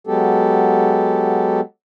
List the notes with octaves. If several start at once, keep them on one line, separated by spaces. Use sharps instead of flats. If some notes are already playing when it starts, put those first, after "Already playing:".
F#3 G#3 B3 G4 A4